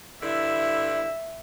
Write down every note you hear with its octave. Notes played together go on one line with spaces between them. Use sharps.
G2 D3 E4 E5